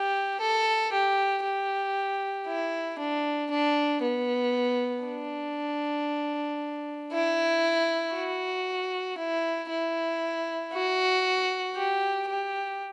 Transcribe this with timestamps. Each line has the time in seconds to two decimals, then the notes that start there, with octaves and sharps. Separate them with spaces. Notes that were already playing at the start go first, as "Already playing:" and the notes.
Already playing: G4
0.41 A4
0.92 G4
1.44 G4
2.47 E4
2.99 D4
3.51 D4
4.02 B3
5.05 D4
7.12 E4
8.14 F#4
9.18 E4
9.70 E4
10.73 F#4
11.76 G4
12.28 G4